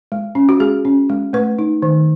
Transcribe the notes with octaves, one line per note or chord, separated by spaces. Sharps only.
G#3
C#4
F#4
G#3 G#4
C#4
G#3
A3 B4
D#4
D#3